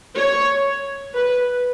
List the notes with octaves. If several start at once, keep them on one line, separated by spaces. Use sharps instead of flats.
C#5
B4